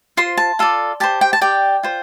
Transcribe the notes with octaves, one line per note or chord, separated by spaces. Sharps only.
F4 C5 C6
A5
F4 A4 D5
G4 C5 A5
G5
A5
G4 D5 G5
F4 C5